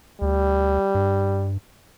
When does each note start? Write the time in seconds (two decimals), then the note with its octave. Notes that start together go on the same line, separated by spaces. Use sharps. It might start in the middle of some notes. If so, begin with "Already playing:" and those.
0.22 D2 G3
0.95 G2